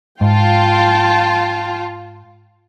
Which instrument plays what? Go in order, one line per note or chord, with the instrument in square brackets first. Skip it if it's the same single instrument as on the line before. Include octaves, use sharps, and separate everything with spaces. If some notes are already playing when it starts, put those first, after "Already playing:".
[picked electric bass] G#2 [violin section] F4 [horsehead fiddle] G5 A5